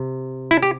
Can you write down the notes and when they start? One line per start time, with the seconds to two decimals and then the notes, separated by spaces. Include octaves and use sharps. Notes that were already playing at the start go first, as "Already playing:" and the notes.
Already playing: C3
0.51 E4
0.63 G4